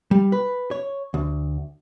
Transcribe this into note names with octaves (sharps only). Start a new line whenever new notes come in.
G3
B4
C#5
D2